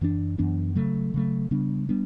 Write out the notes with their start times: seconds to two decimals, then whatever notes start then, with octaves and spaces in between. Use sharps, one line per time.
0.01 F#2 E3 B3 D4
0.38 F#2 E3 B3 D4
0.75 C#3 F#3 A3
1.14 C#3 F#3 A3
1.51 C#3 G3 B3 D4
1.89 G3 B3 D4